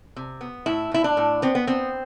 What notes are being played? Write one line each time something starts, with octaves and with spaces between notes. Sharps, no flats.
C3
B3
A2 E4
A2 E4
D4
A2
B3 C4
B3
B3 C4